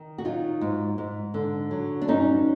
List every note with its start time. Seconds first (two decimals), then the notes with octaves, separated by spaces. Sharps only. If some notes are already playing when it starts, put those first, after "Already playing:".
Already playing: D#3
0.18 F#4
0.25 F#3 D#4 F4
0.61 G#2
0.98 G#2
1.34 D3
1.71 F#3
2.02 D4
2.08 G2 C#4 D#4